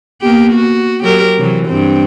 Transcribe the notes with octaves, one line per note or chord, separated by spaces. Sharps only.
A#3 B3 G4
F#4
F#3 G4 A#4
C3 E3 F#3
G2 C4